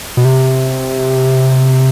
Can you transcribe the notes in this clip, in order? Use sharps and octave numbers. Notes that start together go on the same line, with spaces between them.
B2
C3